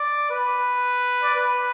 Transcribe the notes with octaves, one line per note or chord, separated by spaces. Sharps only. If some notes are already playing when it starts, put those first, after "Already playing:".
Already playing: D5
B4
D5
B4